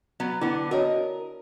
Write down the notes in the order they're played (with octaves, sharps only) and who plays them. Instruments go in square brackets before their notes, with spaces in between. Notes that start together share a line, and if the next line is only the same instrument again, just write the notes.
[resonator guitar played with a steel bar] F#3 B3
[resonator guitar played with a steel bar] D3 B3 [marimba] E4
[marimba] F#4 C#5 [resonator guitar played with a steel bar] A#4 D#5